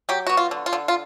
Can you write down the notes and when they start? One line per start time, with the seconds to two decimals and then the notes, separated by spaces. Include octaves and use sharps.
0.09 F#3 G4
0.27 B3 F#4
0.37 F4
0.51 D3
0.66 F4
0.73 D3
0.88 F4